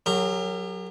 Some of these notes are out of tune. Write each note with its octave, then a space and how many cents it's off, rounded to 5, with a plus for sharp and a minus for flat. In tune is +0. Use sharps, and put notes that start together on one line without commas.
F#3 +0 G4 +45 A#4 -25